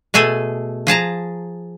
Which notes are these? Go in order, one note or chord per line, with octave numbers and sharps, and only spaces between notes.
B2 A3 G#4 A4 G#5
F3 G#4 A5 A#5